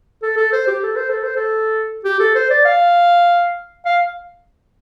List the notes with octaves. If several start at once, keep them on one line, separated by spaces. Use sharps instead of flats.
A4
A4
C5
G4
A4
C5
A4
C5
A4
G4
A4
C5
D5
F5
F5